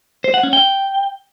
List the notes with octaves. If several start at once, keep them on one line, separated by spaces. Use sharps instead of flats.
C5
F#5
C#4
G5